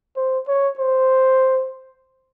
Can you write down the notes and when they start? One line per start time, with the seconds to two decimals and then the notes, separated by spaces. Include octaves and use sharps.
0.16 C5
0.48 C#5
0.79 C5